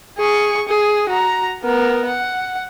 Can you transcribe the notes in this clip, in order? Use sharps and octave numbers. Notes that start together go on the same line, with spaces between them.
G#4 C#6
G#4
F#4 A#5
B3 A#4
F#5